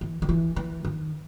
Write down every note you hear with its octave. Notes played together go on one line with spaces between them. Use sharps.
E3
D#3
E3
E3
D#3